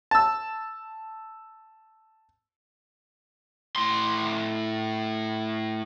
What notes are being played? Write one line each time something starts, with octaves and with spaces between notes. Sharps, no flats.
A5 E6
A2 C6